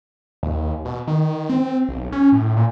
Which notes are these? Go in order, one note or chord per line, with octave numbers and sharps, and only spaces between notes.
D#2
B2
D#3
C4
B1
C#4
A2
A#2